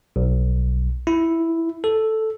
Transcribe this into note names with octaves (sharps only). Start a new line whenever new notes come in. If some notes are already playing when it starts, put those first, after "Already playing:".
B1
E4
A4